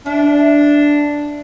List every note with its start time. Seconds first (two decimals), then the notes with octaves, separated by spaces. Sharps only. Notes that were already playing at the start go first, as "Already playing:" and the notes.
0.06 D4 E4